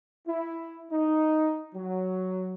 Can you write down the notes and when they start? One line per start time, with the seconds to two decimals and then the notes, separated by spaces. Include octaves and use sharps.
0.26 E4
0.90 D#4
1.73 F#3